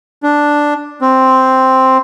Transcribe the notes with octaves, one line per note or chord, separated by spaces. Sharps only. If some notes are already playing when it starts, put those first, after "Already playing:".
D4
C4